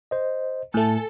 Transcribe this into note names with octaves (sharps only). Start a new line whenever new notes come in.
C5 D#5
A2 A3 A4 G#5